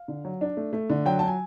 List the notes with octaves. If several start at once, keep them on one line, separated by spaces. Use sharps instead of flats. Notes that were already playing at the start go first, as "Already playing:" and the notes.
Already playing: F5
D3
F#3
D4
A3
A3
D3
F#3 G5
A5
F#3 G#5